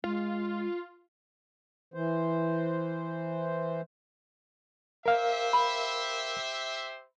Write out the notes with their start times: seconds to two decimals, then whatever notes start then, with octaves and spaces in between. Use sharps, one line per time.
0.04 G#3 F4
1.94 E3 C5
5.06 G4 A#4 C5 E5 F5
5.53 B5